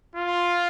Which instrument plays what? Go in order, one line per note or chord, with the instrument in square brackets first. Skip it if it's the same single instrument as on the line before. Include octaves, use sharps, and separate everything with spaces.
[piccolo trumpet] F4